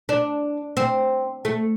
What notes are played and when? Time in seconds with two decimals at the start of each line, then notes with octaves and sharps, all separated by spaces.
0.09 D4
0.77 C4
1.45 A3